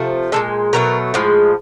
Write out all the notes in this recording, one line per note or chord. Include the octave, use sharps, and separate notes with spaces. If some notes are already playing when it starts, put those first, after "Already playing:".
Already playing: C3 F3 A3
A#2 F3 G#3 A4
B2 F#3 A3 A#4
A2 F3 G#3